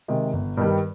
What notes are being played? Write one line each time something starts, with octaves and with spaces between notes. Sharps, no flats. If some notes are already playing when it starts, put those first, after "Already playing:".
C3 D#3 G#3
G1
G2 D#3 G3